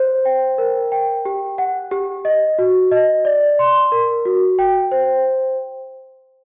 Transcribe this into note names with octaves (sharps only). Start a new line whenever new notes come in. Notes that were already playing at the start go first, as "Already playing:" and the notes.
Already playing: C5
G5
A#4
G5
G4
F#5
G4
D#5
F#4
D#5
D5
C6
A#4
F#4
G5
C5